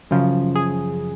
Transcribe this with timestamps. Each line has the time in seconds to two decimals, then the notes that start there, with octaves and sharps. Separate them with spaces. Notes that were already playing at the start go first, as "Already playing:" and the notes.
0.11 F#2 C#3 F3
0.55 G#4